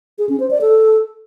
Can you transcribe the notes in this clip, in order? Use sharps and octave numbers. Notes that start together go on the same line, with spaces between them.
G#4
C#4
C5
D5
A4